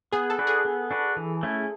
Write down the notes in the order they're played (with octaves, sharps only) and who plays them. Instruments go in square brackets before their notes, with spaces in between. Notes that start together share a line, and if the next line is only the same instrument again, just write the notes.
[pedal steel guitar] B3 [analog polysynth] G#4
[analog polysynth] A4
[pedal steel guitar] D4 F#4 B4
[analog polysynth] G#4
[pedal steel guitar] B3
D4 F#4 B4
E3
A3 C#4 E4